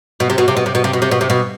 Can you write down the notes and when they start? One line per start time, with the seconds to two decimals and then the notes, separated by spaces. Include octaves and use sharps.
0.20 B2
0.30 C3
0.38 B2
0.48 C3
0.57 B2
0.66 C3
0.75 B2
0.84 C3
0.93 B2
1.02 C3
1.11 B2
1.21 C3
1.30 B2